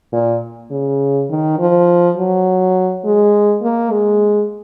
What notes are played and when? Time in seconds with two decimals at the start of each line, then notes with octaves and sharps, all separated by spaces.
0.13 A#2
0.71 C#3
1.30 D#3
1.59 F3
2.17 F#3
3.04 G#3
3.62 A#3
3.91 G#3